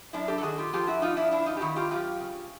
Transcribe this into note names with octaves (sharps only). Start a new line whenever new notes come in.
F#2 D4 E4
G4 A4
A4
D#3 F#4 G#4
F4 G4
F3 F4 G4
E4 F#4
F3 D#4 F4
D4 E4
G2 D4 E4
D#4 F4
G4
D#3 E4 F#4
F4 G4
F#2 F4 G4
C#3